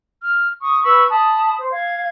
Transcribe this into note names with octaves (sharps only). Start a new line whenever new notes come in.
F6
C#6 D#6
B4 B5 C#6 E6
A5 B5 D#6
C5
F5 G#6